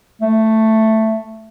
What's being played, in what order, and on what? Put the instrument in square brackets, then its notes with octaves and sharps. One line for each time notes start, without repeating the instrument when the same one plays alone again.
[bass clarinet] A3